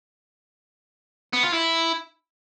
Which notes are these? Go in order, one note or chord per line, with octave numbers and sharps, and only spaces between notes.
B3
F4
E4